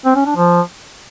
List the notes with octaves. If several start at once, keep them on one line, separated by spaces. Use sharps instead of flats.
C4
C#4
D4
F3